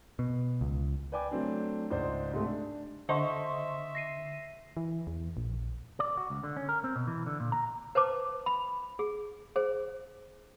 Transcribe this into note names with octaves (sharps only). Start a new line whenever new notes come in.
B2
C#2
B4 D5 G5 G#5 D6
F#3 A3 C4 D4
C#2 G#2 C5 D5
G#2 C3 G#3 A3
D4
D3 C5 D#5 E5 F#5 A5 C6 C#6
A#6 C7 D#7
E3
E2
A#1
D5
F#4
C#2
D3
C#4
A#4
C4
B2
E3
D3
A#2
A#5
B4 C5 A5 D6
B5
G#4
G#4 C5